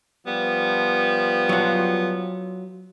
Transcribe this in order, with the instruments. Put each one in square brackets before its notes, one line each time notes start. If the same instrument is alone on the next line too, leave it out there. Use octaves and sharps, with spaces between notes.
[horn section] F3 G3 B3
[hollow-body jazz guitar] F#3 F4